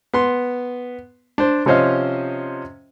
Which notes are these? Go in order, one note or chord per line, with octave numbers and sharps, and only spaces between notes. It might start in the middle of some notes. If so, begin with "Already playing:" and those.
B3 C6
D4 C5
C3 F3 C#4 C5 D#5 F5